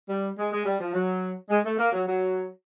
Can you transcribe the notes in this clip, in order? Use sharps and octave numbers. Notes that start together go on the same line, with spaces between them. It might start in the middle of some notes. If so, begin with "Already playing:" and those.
G3
G#3
G#3
G3
F3
F#3
G#3
A3
A#3
F#3
F#3